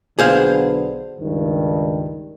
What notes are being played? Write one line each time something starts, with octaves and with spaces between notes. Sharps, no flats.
B1 D3 B3 G#4 C5 F5
C#2 G2 D#3